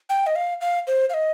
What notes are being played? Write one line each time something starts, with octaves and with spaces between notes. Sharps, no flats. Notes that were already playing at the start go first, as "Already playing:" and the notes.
G5
D#5
F5
F5
C5
F5
D#5